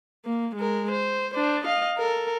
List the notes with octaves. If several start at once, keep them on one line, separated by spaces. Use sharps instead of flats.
A#3
G#3 A#4
C5
D4 C5
D#5 F5
A4 A#4